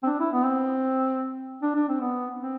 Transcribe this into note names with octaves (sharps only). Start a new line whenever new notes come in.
C4
D4
E4
B3
C4
D4
D4
C4
B3
C4